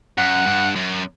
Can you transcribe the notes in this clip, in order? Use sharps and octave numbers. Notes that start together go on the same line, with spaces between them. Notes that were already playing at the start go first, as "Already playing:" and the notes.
F#2 F#5
G2
F#2